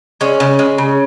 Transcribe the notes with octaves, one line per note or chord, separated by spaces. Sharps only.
G#3 C#4
C#3
G#3
C#3